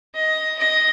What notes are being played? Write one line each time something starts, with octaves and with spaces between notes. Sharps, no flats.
D#5
D#5